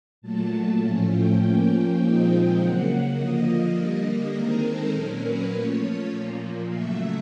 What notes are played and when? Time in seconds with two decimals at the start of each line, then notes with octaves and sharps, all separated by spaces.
0.22 A#2 F#3 A3 A5
0.81 A2 F3 A3 C#4
1.10 G5
1.40 F3 A#3 C#4 G5
1.99 A#2 F3 G#3 C4 D#4
2.58 C#3 F#3 A#3 F#5
3.16 D3 F3 A#3 D#5
3.76 D3 G3 A#3
4.34 D#3 G#3 C4 D#4 A#4
4.64 A4
4.94 A#2 F#3 A#3 C#4 A#4
5.23 B4
5.52 F3 A3 C#4 C#5
6.11 A#2 F3 A#3
6.70 C#3 F#3 A3 E5